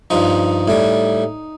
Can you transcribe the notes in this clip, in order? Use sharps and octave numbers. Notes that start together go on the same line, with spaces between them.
G2 F3 D#4
A2 G3